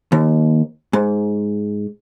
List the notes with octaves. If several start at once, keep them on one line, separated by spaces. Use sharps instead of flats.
D#2
G#2